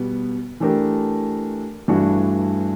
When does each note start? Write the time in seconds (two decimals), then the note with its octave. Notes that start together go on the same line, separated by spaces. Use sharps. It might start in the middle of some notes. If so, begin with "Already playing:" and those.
Already playing: B2 G3 B3
0.60 E3 A3 D4 G4 A#4
1.88 G2 E3 A3 D4 F#4